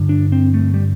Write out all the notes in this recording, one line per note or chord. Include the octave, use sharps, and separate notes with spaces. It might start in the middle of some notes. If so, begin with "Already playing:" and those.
Already playing: G2 D3
D4
C4
A3
G3